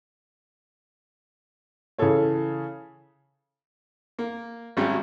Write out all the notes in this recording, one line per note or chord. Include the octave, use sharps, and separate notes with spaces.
C#3 E3 G#4 A4 C#5
A#3
G#1 F#3 G3 C#4 G4